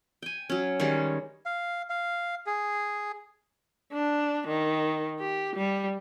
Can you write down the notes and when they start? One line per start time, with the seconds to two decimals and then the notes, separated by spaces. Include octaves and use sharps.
0.22 G5 G#5
0.50 F#3 C#4
0.80 D#3 G3 G#3 C#4
1.46 F5
1.90 F5
2.46 G#4
3.93 D4
4.47 D#3
5.20 G4
5.56 G3